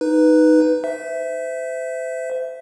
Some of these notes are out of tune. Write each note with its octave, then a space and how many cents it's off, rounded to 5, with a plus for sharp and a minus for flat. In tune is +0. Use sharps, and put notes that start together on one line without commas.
D#4 +0 B4 +0
C5 -30 E5 +0